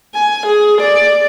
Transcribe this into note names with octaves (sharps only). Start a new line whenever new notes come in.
G#5
G#4
D5